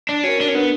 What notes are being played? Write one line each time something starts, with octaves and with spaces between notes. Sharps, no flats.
D4
C#4 F#4 A#4
D4
C#4
B3 D4